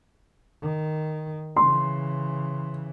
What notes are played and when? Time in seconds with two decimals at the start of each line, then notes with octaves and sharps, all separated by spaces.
0.62 D#3
1.56 C#3 E3 C6